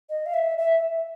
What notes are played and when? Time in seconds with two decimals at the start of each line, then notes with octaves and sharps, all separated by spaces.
0.10 D#5
0.26 F5
0.34 E5
0.58 E5